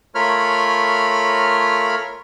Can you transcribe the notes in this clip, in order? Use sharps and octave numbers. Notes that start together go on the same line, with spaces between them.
A3 F4 A#4 C#5 B5 F6